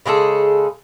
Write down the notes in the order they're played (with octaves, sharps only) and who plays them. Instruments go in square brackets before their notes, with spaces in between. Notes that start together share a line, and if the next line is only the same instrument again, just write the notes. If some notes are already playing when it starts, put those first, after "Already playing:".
[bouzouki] C#3 G#3 G#4 A4